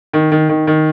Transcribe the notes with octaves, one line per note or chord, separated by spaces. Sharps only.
D#3
D#3
D#3
D#3